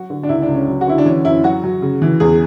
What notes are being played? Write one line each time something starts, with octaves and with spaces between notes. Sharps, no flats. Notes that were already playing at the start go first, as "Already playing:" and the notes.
Already playing: F#3 F#4
D3
D4
C#2 E4
D4
C#2
C#4
F#3
F#4
D3 E4
D4
E3 C#4
F#2 E4
F#3 F#4
F#3
C#3
E3
E2 G#4